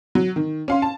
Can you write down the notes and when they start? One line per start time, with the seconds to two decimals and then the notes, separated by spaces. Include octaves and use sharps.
0.15 F#3
0.36 D#3
0.68 C#4 F5 C6
0.82 A5